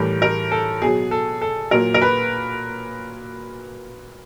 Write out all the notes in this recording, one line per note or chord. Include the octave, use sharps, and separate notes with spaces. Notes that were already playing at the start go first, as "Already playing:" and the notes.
Already playing: A2 E3 G3 A#4
A#4
A4
B2 F#3 G#4
A4
A4
A#2 F#3 A#4
A#4
B4